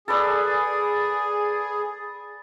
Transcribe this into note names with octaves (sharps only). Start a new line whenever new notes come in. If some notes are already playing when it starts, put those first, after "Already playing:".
G#4 A4 B4 D5